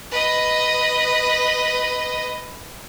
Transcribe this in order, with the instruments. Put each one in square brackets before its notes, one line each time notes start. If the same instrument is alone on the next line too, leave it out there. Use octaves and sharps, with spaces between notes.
[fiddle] B4 D#5